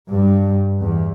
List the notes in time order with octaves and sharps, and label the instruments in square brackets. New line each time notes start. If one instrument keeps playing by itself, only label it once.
[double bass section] G2
E2